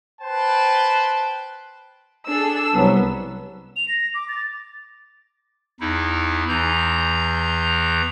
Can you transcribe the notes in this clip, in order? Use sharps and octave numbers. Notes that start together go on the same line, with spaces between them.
B4 C5 G5 A5
D4 G#4 A4 E6
C2 F#3 B3
F7
A#6
D6
A6
E2 D#4 E4
E2 E3 A#5 G6